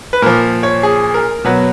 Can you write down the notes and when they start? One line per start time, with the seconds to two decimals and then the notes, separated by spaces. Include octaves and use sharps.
0.13 B4
0.22 A#2 F3 A#4
0.63 C#5
0.83 G#4
1.14 A#4
1.44 B2 F#3 B4